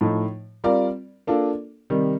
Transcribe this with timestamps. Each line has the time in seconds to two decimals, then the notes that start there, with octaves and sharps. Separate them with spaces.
0.01 A2 F3 A3 D#4
0.64 G3 C4 F4 A#4 D5
1.27 A#3 D4 F4 A4
1.90 C3 D#3 G3